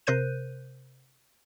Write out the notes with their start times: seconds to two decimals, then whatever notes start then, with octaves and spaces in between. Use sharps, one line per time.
0.07 C3 A#4 C5 F#6 G6 D#7